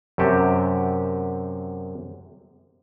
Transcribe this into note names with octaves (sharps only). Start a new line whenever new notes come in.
F#2 C3 F#4 G4 A5